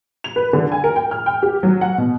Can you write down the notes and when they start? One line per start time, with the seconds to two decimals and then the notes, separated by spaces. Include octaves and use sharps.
0.24 F7
0.36 B4
0.53 D3
0.72 G#5
0.84 A#4
0.96 G5
1.11 F6
1.26 G5
1.43 G4
1.63 F#3
1.81 F#5
1.98 B2